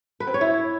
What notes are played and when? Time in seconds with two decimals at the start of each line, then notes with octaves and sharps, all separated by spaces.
0.20 B4
0.27 C4
0.34 C#5
0.41 E4